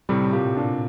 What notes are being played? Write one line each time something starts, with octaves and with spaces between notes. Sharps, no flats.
A2 C3 G3
A2
A#2 G4
A#2 D4